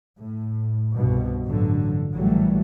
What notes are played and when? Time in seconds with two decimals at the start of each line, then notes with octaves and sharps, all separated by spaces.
0.21 A2
0.97 C2 G2 B2
1.45 A1 G2 D3 F#3
2.13 A#1 E3 F#3 G3 A3